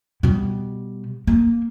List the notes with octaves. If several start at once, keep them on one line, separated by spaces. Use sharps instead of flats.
B2 G3
A#3